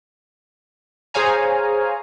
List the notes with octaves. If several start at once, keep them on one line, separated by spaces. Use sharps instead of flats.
G#4 C5 C#5 F5 G#5 A#5